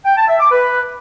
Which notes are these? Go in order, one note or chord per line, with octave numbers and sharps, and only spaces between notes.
G5
A5
E5
D6
B4